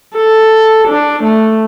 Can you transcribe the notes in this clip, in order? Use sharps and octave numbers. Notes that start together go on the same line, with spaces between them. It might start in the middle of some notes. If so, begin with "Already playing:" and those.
A4
D4
A3